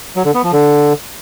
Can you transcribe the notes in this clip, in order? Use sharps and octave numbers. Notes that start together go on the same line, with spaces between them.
F#3
D3
B3
F3
D3